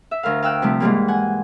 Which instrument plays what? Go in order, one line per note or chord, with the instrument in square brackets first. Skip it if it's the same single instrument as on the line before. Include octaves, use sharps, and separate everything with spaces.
[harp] E5
D2 A#4 F5
F5 G5 E6 F#6
C3 F3 G3 A3
G#2 E3 G3 A#3
F#5 G#5